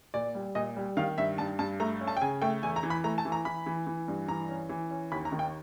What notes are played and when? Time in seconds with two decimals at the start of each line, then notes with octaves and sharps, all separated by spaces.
0.14 A#2 D5
0.35 G3
0.55 A#2 D#5
0.77 G3
0.97 D#3 F5
1.18 G2 E5
1.38 G2 A5
1.59 G2 A5
1.80 A3 A#5
2.01 C#4
2.07 A5
2.17 G5
2.21 C#3 G#5
2.42 A3 G5
2.63 E2 G#5
2.76 A#5
2.83 E3
2.90 B5
3.04 A3 A#5
3.18 A5
3.25 E3
3.32 A#5
3.45 E3 B5
3.66 E3
3.87 E3
4.08 G2
4.28 E3 A#5
4.49 C#4
4.69 E3
4.91 C#4
5.12 D#2 B5
5.25 A#5
5.32 D#3
5.39 G5